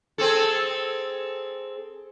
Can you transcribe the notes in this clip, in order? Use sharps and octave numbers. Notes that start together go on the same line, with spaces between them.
C4 G#4 A4